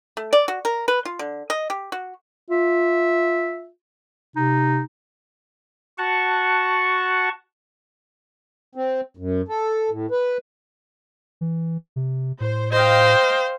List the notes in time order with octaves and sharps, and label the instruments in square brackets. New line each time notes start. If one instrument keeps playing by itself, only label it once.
[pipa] A3
D5
F#4
A#4
B4
F4
D3
D#5
G4
F#4
[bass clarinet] F4 [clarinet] E5
[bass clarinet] C3 [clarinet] D#4
[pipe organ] F#4 F#5 A5 C#6
[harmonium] C4
F#2
A4
A2
B4
[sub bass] E3
C3
[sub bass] A2 [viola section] C5
[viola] C5 [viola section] D#5 F5 G5